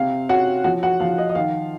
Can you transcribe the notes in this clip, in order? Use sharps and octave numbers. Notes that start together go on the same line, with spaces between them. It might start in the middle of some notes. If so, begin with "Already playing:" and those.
Already playing: C3 C4 F5
C#4 F#4 F#5
F3 F#4 F#5
F#4 F#5
F3 F5
D#5
D#5
D#3 F5